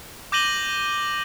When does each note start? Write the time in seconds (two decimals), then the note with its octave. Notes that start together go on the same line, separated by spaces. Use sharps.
0.32 D6 G6 A#6 D#7 F#7 G7